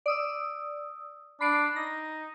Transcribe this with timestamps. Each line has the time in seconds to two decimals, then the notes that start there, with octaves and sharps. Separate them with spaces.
0.06 D5 D#6 E6
1.41 D4 B5 C7 D7
1.76 D#4 A#6